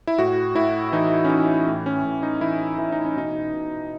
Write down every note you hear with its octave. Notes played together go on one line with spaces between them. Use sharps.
E4
A2 F#4
A2 E4
E3 D#4
C#4
E3 D#4
A2
C#4
A2
D#4
E3 E4
E3 E4
D#4
C#4
B2 D#4
B2